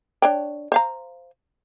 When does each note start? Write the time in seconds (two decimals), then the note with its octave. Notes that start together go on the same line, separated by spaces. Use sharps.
0.22 D4 C#5 G5
0.72 C5 F5 A#5